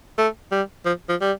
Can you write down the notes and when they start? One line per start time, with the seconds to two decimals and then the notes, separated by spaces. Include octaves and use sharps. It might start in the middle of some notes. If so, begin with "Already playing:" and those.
0.18 A3
0.51 G3
0.85 F3
1.09 F3
1.21 G3